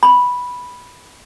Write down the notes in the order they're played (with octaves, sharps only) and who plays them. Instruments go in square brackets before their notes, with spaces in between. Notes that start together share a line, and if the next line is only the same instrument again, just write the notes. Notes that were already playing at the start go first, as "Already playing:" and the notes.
[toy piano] B5